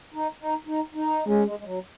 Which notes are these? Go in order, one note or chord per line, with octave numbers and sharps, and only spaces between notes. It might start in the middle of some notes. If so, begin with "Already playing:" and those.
D#4
D#4
D#4
D#4
G#3 C#4
G#3
G#3
F#3